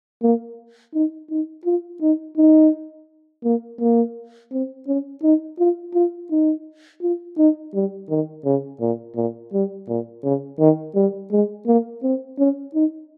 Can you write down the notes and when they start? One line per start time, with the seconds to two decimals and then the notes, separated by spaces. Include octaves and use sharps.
0.23 A#3
0.94 D#4
1.30 D#4
1.65 F4
2.01 D#4
2.37 D#4
3.44 A#3
3.81 A#3
4.52 C4
4.87 C#4
5.23 D#4
5.59 F4
5.94 F4
6.31 D#4
7.02 F4
7.38 D#4
7.74 G3
8.09 D#3
8.45 C#3
8.81 A#2
9.16 A#2
9.53 G3
9.88 A#2
10.24 C#3
10.59 D#3
10.95 G3
11.32 G#3
11.67 A#3
12.03 C4
12.39 C#4
12.74 D#4